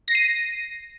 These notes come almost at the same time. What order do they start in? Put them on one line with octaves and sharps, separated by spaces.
A#6 C7 D#7